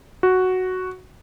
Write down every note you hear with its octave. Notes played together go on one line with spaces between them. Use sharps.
F#4